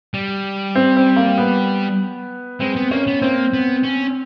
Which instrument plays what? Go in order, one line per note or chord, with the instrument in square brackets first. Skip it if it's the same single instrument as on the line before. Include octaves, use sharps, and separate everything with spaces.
[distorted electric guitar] G3
[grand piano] C4
C4
A#3
B3
[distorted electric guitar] G#3 [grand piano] C4
[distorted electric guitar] B3
[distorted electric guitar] A#3 [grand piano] C#4
[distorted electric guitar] B3
[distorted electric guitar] A#3 [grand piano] C4
[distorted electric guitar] B3
C#4